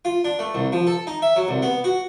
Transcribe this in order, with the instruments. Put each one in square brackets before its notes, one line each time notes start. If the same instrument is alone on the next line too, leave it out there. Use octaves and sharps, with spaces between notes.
[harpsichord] F4
D4
A3
C2
F3
A4
D#4
E5
F#3
C2
B3
F#4